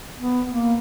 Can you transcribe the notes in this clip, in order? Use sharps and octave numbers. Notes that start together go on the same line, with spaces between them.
B3
A#3